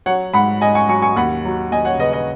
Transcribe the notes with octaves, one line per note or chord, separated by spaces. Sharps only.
F#3 C#5 F#5
G#2 F#5 B5
G#2 D#5 G#5
G#5 C#6
F#3 G#5 C#6
G#5 C#6
D#2 F#5 B5
F#3
D#2 D#5 G#5
C#5 F#5
C#3 B4 D#5
B4 D#5